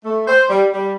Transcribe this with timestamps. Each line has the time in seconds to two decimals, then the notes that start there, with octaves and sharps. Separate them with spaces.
0.05 A3
0.28 C5
0.49 G3
0.73 G3